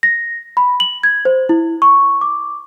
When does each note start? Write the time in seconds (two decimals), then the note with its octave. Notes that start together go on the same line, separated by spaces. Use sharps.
0.03 A#6
0.57 B5
0.80 F#7
1.03 G#6
1.25 C5
1.49 E4
1.82 C#6
2.21 D6